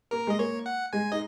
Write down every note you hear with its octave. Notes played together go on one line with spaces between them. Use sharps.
A#3 A#4
G#3 D#5
A#3 C#5
F#5
G#3 G#5
D#4 D#5